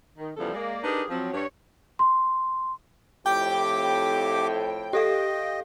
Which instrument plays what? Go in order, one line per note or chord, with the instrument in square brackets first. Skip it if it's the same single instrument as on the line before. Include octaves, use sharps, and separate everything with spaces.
[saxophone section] D#3
E2 C#3 F3 G3 A4
G#3 A#3 D5
D4 D#4 G4 G#4 A#4 B4
F3 F#3 C4
G2 C#5
[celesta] C6
[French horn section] F2 A2 [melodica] G4 D6 [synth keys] G5
[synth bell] G4 A4 F5 [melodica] D#5